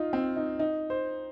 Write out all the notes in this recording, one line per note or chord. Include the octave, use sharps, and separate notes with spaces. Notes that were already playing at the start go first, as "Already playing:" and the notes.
Already playing: D#4 F4
C4
D#4
D#4
C5